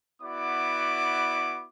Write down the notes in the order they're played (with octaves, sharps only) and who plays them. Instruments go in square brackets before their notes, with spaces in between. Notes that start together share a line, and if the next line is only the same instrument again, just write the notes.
[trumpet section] B3 E4 F#4 D5 D6